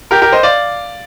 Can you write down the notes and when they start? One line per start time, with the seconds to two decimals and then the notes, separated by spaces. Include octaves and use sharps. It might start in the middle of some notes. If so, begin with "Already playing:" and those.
0.11 G4 A#4
0.22 G4 A#4
0.33 C5 D#5
0.43 D5 F5